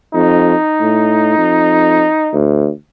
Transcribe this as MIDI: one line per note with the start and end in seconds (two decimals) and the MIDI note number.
0.14 0.54 41
0.14 2.38 63
0.81 1.38 45
1.38 2.07 41
2.33 2.69 38